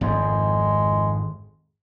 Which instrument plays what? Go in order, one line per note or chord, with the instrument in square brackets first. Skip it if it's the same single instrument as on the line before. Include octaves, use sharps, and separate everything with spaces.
[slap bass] G#1 F2 G#2 [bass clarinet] G#3